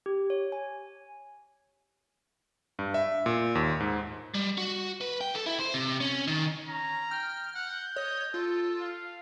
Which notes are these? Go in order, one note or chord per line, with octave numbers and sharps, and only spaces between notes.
G4
C#5
G#5
G2
E5
A#2
D#2
G#2
G3
F#4
B4
G5
A4
E4
C5
C3
C#4
D#3
C#4 A#5
G5 F6
F#5 G6
C#5 D#5
F4 A4
F5